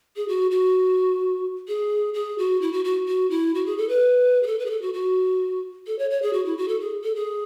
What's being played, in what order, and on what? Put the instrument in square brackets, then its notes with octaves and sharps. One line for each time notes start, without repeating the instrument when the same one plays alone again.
[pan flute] G#4
F#4
F#4
G#4
G#4
F#4
E4
F#4
F#4
F#4
E4
F#4
G#4
A4
B4
G#4
A4
B4
G#4
A4
F#4
F#4
A4
C#5
C#5
G#4
F#4
E4
F#4
A4
G#4
A4
G#4